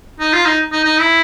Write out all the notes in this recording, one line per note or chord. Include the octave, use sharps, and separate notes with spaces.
D#4
F4
D#4
D#4
D#4
E4